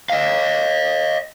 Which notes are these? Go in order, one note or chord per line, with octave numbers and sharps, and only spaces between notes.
D#5 F5